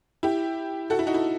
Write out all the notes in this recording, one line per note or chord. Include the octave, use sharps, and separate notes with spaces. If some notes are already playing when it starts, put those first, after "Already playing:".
E4 G4
F#4 A4
E4
D#4 F#4
E4